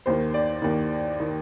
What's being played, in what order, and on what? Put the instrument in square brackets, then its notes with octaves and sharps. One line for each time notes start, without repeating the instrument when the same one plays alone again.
[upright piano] D#2 D#3 C5
D5
D#2 D#3
D#3